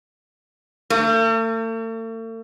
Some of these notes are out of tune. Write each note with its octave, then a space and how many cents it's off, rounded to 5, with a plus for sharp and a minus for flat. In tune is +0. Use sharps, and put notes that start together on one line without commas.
A3 +45